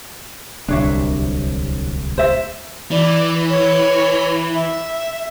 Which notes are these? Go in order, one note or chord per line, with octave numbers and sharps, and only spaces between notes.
D1 C2 D4 C#5 E5
C5 E5
E3 D5
C#5
E5